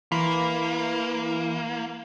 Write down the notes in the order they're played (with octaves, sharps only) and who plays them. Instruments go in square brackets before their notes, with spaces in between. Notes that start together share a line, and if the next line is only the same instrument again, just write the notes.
[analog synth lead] E3 [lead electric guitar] A#3 [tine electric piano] B5 C6